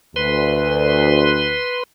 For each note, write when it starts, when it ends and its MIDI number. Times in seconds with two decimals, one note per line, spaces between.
0.16 1.58 38
0.16 1.83 71
0.16 1.83 84